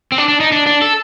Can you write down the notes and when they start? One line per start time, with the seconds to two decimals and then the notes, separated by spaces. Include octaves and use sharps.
0.12 C4
0.18 D4
0.28 D4
0.40 D#4
0.52 D4
0.66 D4
0.82 A4